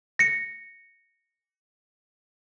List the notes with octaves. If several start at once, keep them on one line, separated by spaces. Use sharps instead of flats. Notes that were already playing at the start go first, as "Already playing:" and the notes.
A#6 C#7